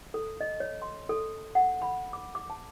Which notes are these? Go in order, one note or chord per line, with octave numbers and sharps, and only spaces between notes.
A4
D#5
C#5
C6
A4
F#5
B5
D6
D6
A5